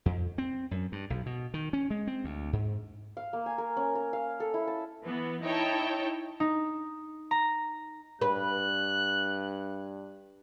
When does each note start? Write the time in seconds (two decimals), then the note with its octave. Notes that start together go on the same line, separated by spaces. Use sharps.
0.06 F2
0.38 C4
0.71 F#2
0.92 G2
1.10 B1
1.26 B2
1.54 D#3
1.73 C#4
1.90 G#3
2.07 C4
2.24 D2
2.53 G#2
3.17 F5
3.33 A#3
3.46 G#5
3.58 A#4
3.77 C#4
3.95 A#5
4.13 F5
4.40 A4
4.54 E4
4.68 A5
5.04 E3 B3
5.42 D#4 E4 C#5 G5 A5
6.40 D#4
7.31 A#5
8.22 G2 B4 F#6